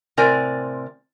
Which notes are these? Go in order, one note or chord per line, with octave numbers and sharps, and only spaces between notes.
A2 C3 C4 A#4 D5 G#5